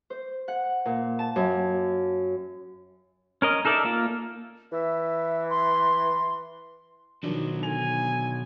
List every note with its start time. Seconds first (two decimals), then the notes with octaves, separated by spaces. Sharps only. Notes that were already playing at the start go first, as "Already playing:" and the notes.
0.10 C5
0.48 F#5
0.85 A#2
1.19 A5
1.36 F#2
3.42 C#4 A#4 D#5
3.65 D#4 A4 A#4 D5 E5
3.85 A#3 F4
4.72 E3 E5
5.50 C6
7.23 B2 D#3 F3 F#3 D4
7.63 D3 G#5 F7